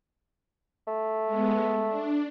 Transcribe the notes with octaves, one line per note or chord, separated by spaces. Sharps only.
A3
G#3 B3
D4